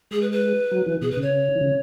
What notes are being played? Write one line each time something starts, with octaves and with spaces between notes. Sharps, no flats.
G#3 G#4
B4
B4
F#3
E3
B2 G#4
B4
C#3
C#5
E3
C#3